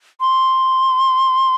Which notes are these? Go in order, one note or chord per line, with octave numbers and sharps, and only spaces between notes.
C6